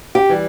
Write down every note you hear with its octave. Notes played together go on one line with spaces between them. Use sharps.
G4
E3 G3